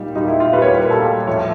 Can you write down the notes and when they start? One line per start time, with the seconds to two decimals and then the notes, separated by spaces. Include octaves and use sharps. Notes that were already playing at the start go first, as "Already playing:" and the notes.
Already playing: A#2 G3 D#4
0.16 A#2 G3 D#4
0.28 E4
0.40 F4
0.53 A#2 G3 B4
0.62 C#5
0.72 B4
0.81 A#4
0.90 A#2 G3 A4
1.27 A2 F3 A3 C#5